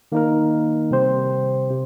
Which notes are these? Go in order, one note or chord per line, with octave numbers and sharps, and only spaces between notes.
D#3 A#3 D#4 A#4
C3 G3 C4 G4 C5
C3